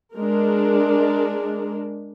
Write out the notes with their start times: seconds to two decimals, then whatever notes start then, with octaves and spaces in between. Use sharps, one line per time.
0.15 G#3 D4 A#4